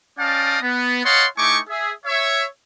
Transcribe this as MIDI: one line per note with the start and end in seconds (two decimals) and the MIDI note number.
0.19 0.58 61
0.19 0.58 74
0.19 0.58 75
0.19 0.58 77
0.19 0.58 79
0.19 0.58 81
0.62 1.04 59
1.05 1.25 73
1.05 1.25 75
1.05 1.25 77
1.05 1.25 78
1.05 1.25 81
1.05 1.25 84
1.37 1.59 57
1.37 1.59 63
1.37 1.59 64
1.37 1.59 80
1.37 1.59 85
1.37 1.59 86
1.69 1.92 68
1.69 1.92 76
2.06 2.45 73
2.06 2.45 76